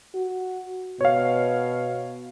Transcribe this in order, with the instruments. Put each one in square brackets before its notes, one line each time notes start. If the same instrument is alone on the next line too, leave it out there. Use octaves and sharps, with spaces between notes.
[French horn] F#4
[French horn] B2 [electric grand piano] C#5 F5